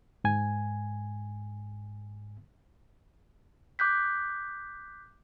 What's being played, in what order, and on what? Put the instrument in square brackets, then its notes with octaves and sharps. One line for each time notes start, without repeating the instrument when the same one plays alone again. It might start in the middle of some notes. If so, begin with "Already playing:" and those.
[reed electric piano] G#2 G#5
[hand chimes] D6 F#6 G6 B6